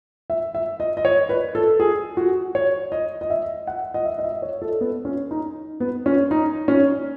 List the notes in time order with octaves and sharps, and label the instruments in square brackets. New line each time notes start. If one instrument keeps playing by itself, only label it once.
[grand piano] E5
E5
D#5
D#5
C#5
B4
A4
G#4
F#4
C#5
D#5
D#5
E5
F#5
D#5
E5
D#5
E5
C#5
A4
B3
C#4
D#4
B3
C#4
D#4
C#4